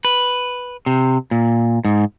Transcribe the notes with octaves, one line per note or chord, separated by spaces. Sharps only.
B4
C3
A#2
G#2